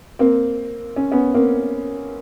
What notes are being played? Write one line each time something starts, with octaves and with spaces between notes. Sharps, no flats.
A#3 C4
C#4
B3 C#4
A#3 C4